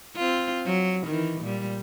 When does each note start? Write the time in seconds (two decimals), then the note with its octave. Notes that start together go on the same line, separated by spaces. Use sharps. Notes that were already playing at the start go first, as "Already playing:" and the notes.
0.16 C4 F4
0.66 F#3
1.07 D#3 E3
1.42 A#2 G3